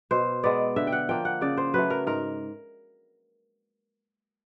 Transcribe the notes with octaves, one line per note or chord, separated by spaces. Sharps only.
B2 C5
G#3 B3 D5
D3 E5
G5
F#5
F3 A#3 G5
F#5
C#3 D5
C5
F#3 A3 B4
A#4
G#2 A#4